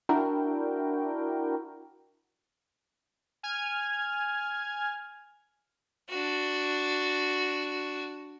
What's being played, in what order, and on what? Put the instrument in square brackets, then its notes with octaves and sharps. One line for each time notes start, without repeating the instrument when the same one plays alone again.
[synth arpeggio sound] D4 E4 F#4 A#4 G5
[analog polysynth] G#5 F6 G#6
[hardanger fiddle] D4 F#4